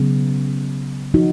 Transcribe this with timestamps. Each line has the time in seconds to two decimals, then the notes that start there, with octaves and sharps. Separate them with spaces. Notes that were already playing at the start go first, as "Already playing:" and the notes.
Already playing: C#3 F#3 B3
1.14 F3 D#4 F#4